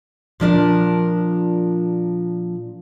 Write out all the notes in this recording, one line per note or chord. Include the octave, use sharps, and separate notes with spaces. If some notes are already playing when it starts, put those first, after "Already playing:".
A#2 F3 D4 A#4